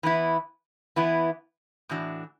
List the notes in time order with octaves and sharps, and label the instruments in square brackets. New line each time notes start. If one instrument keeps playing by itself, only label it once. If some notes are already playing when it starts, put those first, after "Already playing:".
[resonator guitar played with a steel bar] E3 B3 E4
E3 B3 E4
A2 E3 D4 F#4